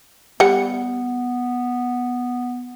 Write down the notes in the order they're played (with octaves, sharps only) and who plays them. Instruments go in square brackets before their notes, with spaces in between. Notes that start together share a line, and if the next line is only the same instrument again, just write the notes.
[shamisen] G3 F#5 [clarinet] B3